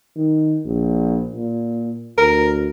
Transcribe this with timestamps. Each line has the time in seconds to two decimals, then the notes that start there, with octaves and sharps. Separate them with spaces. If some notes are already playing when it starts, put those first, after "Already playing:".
0.16 D#3
0.65 A#1
1.34 A#2
2.18 D2 A#4